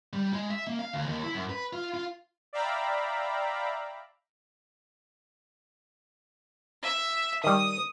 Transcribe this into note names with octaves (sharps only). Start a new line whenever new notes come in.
G3
G#3
E5
A#3
F5
D2
D#2
E4
F#2
B4
F4
F4
D5 E5 F5 G5 A#5 B5
E5
D#3 G3 D#6